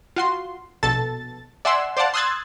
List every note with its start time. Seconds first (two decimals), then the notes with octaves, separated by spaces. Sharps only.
0.16 F4 F#4 C6
0.83 A#1 B2 A4 A5 A6
1.65 D5 E5 F#5 G#5 C6 E6
1.97 C5 D5 F5 F#5 A5
2.14 C6 D#6 E6 F#6 G#6 A6